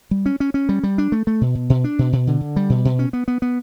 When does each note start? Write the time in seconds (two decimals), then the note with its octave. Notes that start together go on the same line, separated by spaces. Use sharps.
0.11 G3
0.26 C#4
0.40 C#4
0.54 C#4
0.69 G3
0.83 G3
0.98 D4
1.12 A3
1.27 A3
1.41 B2
1.55 B2
1.70 B2
1.84 D4
1.99 B2
2.13 B2
2.27 D3
2.41 D3
2.56 G3
2.70 B2
2.85 B2
2.99 C#4
3.13 B3
3.28 B3
3.42 B3